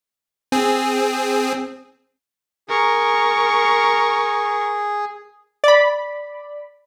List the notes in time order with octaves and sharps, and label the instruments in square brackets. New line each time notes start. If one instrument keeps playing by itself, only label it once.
[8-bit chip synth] C4 G#4
[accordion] G#4 [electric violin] A#4 C#6
[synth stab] D5 B5